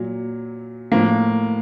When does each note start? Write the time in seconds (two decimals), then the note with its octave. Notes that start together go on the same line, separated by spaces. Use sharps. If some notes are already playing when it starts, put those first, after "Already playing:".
Already playing: A#2 F#3
0.92 A2 F3 A#3